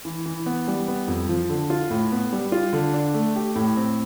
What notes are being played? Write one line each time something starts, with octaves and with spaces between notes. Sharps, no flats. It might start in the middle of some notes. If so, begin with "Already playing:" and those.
E3
E3
B3
G3
B3
F2
F3
D3
F4
A2
B3
G3
F4
D3
D4
A3
G4
A2
C4